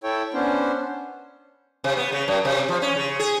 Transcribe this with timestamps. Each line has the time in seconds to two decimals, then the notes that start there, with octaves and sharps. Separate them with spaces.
0.04 E4 A4 C#5 G5
0.34 B3 C#4 D4 C5
1.84 C3
1.97 B3
2.12 C#3
2.28 F#2
2.45 C3
2.69 F3
2.82 C#4
2.96 C#3
3.19 G#4